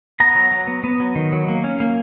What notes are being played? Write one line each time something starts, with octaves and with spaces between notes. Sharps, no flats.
B3 A#5
F#3
F#3
B3
B3
F#3
D#3
F#3
A#3
C#4
A#3